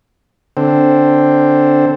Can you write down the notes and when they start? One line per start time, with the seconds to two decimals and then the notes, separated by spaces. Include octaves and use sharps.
0.57 D3 C4